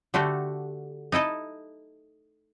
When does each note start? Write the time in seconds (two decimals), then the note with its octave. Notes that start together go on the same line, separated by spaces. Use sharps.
0.14 D3 A3 F#4 G4
1.12 D#4 E4 A4 D#5